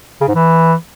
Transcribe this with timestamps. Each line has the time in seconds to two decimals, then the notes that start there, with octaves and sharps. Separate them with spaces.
0.21 C#3
0.28 G#2
0.35 E3